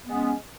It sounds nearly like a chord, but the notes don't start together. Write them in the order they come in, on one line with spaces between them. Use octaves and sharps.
B3 G#3 C#4